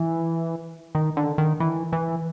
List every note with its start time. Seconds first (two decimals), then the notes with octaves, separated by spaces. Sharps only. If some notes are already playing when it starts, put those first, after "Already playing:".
Already playing: E3
0.95 D#3
1.17 D3
1.38 D#3
1.60 E3
1.93 E3